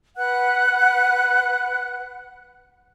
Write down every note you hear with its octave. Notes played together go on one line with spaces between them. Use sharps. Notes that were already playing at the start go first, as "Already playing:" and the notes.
B4 F#5 F#6